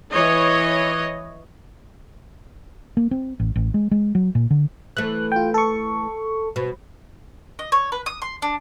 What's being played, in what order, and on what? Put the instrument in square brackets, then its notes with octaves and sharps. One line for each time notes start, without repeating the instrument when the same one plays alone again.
[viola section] E3 C#5 D#5
[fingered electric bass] A#3
C4
A1
A1
G#3
G#3
F#3
A#2
D3
[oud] E3 A3 [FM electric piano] F#6
[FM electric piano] F4 G5
A4 C#6
[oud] B2
[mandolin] D#5
C#5
B4
D#6
C6
D4